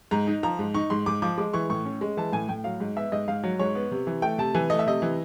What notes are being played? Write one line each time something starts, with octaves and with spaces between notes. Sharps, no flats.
G#2 A#5
D#4
F3 A#5
G#2
D#4 C#6
G#2 C6
G#2 D6
F3 D6
G#3 D6
E3 C#6
A2 C#6
C#4
G#3
E3 A5
A2 G#5
A2 G5
F#3 F5
G#2
B3 E5
G#2 D#5
G#2 F5
F#3
G#2 C#5
B3
C3
E3
A3 G5
C3 A5
E3 G#5
A3 D#5
E5
C3 D#5
E3